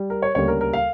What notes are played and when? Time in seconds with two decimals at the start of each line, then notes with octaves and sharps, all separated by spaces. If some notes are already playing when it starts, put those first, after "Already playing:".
Already playing: G3
0.10 A#4
0.22 C#5
0.35 D2 C#3 G3 A#3 C#5
0.48 A#4
0.61 A#4
0.73 F5